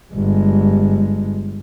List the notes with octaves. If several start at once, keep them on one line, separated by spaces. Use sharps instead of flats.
G1 G#3